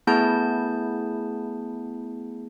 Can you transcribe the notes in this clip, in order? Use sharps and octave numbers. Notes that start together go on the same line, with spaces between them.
A3 B3 E4 G#4 A5 G6